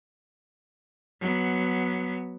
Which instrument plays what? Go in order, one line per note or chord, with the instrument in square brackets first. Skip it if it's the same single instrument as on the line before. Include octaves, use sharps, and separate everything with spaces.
[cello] F#3 B3